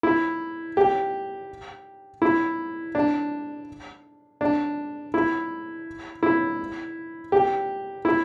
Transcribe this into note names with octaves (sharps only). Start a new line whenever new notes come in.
E4
G4
E4
D4
D4
E4
E4
G4
E4